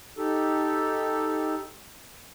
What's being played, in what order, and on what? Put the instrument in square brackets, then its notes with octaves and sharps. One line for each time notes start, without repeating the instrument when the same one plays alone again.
[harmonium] D#4 G4 A4